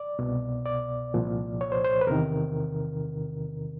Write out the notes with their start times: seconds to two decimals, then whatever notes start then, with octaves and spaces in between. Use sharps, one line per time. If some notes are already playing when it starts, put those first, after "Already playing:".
Already playing: D5
0.19 C2 B2
0.66 D5
1.14 C2 A#2 F3
1.61 C#5
1.72 C5
1.84 C5
2.01 B4
2.07 E2 C3 D#3 A#4